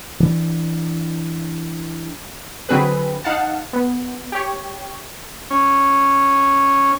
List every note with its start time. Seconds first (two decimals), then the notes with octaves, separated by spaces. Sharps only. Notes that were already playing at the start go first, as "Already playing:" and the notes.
0.20 E3 D4
2.69 D3 F#3 C4 G#4 A4 B4
3.24 D#4 F5 F#5 A5
3.73 B3
4.32 G4 C#5
5.50 C#4